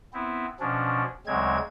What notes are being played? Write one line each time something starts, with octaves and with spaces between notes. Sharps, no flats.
B3 C4 E4
B2 F3 C#4 D4
D2 C#3 F#3 G#3 C4 G#6